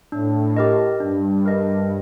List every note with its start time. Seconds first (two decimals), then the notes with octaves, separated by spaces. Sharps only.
0.12 A2 D4
0.57 G4 A#4 D#5
1.00 G2 D4
1.45 G4 A#4 D#5